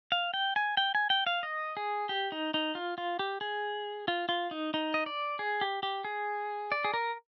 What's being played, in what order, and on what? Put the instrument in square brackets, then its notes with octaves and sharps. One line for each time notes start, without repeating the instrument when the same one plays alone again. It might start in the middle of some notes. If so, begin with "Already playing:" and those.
[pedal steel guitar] F5
G5
G#5
G5
G#5
G5
F5
D#5
G#4
G4
D#4
D#4
F4
F4
G4
G#4
F4
F4
D#4
D#4
D#5
D5
G#4
G4
G4
G#4
D5
G#4
A#4